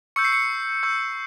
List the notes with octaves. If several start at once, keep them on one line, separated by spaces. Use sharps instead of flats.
C#6 E6 G6 C#7
C7
C#7
C#6 E6 G6